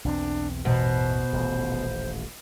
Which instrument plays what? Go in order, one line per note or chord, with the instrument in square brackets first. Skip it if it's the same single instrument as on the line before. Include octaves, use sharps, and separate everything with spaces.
[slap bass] B1 E2 C4 [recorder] D4
[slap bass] A1 E2 G#2 [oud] B2 [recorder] C5
[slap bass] D#1 A1